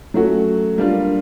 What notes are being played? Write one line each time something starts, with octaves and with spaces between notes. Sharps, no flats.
F#3 A3 C#4 F#4
G3 A#3 D4 F4